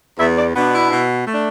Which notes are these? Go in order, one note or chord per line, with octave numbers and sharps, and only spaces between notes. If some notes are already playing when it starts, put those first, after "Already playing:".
E2 E5
D5
B2 B3 D4
E4
B2
A3 D4